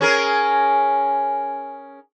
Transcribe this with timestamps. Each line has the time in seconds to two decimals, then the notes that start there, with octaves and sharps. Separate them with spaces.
0.01 C#4 G#4 A#4